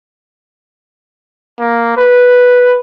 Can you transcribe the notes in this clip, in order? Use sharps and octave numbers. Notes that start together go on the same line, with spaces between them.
A#3
B4